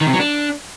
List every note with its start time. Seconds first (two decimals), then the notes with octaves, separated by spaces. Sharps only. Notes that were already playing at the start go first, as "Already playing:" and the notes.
0.01 D#3
0.07 C3
0.13 F#3
0.19 D4